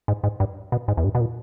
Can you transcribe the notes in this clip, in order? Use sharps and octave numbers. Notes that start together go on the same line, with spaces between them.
G#2
G#2
G2
B2
G#2
E2
G2
B2
A#2